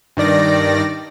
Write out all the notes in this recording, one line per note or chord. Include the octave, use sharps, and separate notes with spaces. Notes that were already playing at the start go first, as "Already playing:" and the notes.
G2 D#3 D5 A#6